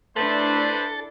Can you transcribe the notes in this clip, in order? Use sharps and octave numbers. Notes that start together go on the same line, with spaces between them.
A3 D4 E4 A4 B4 C5 D5